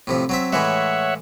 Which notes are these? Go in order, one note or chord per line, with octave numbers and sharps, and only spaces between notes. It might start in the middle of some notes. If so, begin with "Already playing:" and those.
A2 C3 F3
F#3 C4 E5
A2 E3 G#3 C#5 E5 F#5